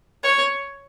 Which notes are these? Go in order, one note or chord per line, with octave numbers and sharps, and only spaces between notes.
C#5